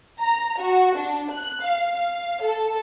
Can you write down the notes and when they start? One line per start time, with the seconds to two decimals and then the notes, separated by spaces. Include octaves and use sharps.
0.20 A#5
0.61 F#4
0.98 D4
1.30 F#6
1.63 F5
1.98 F5
2.44 A4